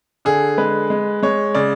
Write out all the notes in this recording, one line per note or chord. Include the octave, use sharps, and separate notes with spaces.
D3 G#4
G#3 B4
G#3
G#3 C#5
C#3 D5